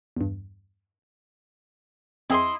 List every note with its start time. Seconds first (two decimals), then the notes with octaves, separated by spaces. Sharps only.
0.16 E2 G2
2.30 F2 C4 E4 G#4 D#5 C6